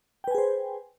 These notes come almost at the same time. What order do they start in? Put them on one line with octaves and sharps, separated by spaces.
G5 B4 G#5 G#4 C5